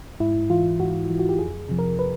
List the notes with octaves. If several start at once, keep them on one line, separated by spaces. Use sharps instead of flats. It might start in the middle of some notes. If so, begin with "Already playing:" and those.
G#2 E4
E3 F4
G#2 F#4
E3
F#4
G4
F2 G#4
C3 F3
A#4
B4